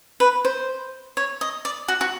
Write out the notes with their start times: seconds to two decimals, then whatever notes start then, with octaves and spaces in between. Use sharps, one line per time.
0.20 B4
0.45 C5
1.17 C#5
1.41 D#5
1.65 D5
1.88 F#4
2.01 F#4